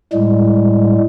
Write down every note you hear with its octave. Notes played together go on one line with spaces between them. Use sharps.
A2 G3 G#3